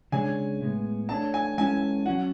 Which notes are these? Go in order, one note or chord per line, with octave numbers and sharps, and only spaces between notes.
C#3 G#3 D4 G#4 C#5 G#5
A2 G#3 B3
A3 D4 A4 C#5 A5
G#5
G#3 C#4 E4 A4 C#5 G#5
F#3 C#4 F#4 F#5